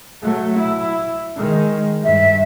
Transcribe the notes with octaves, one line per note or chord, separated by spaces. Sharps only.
F#3 A3
E4
D#3 G#3
G2 E5